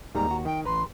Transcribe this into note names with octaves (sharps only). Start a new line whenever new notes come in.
D#2 G#2 D#3 G3 A#5
F#4
D#3 G5
A1 B4 A#5 C6